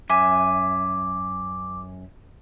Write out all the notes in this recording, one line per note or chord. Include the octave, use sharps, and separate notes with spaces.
F#2 E5 G#5 D6